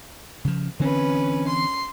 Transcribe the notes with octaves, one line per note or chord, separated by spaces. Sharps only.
C#3 F3
D3 E3 C4 C#4 B4
C6